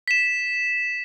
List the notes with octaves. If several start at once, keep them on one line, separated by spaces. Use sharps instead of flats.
B6 E7